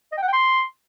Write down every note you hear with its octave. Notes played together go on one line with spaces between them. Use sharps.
D#5
G5
F#5
G5
C6